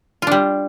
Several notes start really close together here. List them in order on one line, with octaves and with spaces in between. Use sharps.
F4 D4 G3